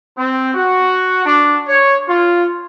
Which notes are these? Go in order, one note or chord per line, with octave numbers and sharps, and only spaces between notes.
C4
F#4
D4
C#5
F4